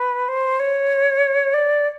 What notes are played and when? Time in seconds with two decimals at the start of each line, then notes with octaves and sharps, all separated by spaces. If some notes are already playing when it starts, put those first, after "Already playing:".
Already playing: B4
0.28 C5
0.59 C#5
1.54 D5